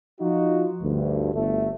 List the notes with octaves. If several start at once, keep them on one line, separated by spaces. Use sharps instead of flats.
F3 D#4 F4 F#4
D2 G2
G1 A3